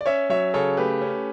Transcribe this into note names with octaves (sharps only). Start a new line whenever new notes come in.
D5
C#4 C#5 E5
F#3 C#5 E5
C#3 A4 C#5
A3 G4 B4
C#4